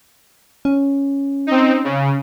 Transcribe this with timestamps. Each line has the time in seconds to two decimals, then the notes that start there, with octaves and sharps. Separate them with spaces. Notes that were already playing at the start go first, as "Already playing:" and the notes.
0.65 C#4
1.47 C4 D#4
1.84 C#3